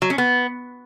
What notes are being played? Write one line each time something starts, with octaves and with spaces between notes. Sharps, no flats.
F#3
C#4
B3